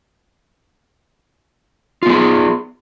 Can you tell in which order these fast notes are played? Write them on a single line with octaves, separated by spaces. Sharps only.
F4 B3 G#4